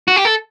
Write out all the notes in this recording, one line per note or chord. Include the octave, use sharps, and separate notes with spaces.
F#4
G4
A4